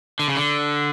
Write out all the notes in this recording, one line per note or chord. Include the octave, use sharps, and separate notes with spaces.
D3
C#3
D3